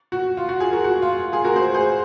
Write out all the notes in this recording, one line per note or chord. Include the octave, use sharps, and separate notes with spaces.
F#4
F4
F#4
F4 G#4
F#4 A#4
F#4
F4
F4 G#4
F#4 A#4
G#4 C5
G#4 C5